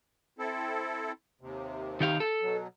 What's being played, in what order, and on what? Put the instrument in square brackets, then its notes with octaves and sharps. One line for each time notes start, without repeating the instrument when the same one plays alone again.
[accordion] C4 E4 A4
D#2 C3
[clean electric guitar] D#3 G4 F5
A4
[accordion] B2 F#3